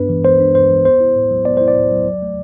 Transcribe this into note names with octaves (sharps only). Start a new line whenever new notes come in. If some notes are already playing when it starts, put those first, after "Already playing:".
Already playing: G2 B3 D4 B4
E3
B3 C5
D4
G2 C5
E3
B3 C5
E4
A2
F#3
B3 D5
E4 C5
D5
A2
F#3
F#3
A3